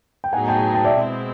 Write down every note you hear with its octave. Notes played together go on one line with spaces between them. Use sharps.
G5
A2 F#3 B3 D#4 G#4 F#5 G#5
G5 A5
G5 A5
D5 E5
B2 G#3 C4 E4